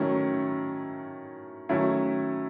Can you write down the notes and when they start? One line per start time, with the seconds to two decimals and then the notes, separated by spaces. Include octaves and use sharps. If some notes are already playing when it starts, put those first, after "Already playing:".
Already playing: D#3 F#3 A3 C#4 E4
1.69 D#3 F#3 A3 C#4 E4